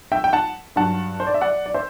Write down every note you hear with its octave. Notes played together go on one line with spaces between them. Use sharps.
E5 G5
G5
F#5 A5
G2 F#3 F#5 A5
C5
D5
E5
D5 F#5
D5
C5 E5